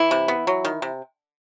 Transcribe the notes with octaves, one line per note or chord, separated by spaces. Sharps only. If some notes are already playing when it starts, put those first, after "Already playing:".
Already playing: E3 E4
C3
B3
F#3
D#3
C3